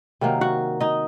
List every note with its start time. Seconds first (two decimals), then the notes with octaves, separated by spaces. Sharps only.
0.21 C3 D#3 F#3 A#3
0.41 F#4 F#5
0.80 D#4 D#5